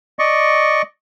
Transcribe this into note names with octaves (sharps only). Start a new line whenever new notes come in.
D5 D#5 C#6